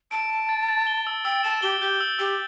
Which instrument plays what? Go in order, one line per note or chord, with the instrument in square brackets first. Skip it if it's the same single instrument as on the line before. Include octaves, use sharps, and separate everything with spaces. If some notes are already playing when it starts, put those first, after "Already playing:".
[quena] A5 [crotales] D7
[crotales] D7
A6
A6
G7
E6
[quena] G5 [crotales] E6
[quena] A5 [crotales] E7
[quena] G4 [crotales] G7
[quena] G4 [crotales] G6
[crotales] E6
[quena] G4 [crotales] E6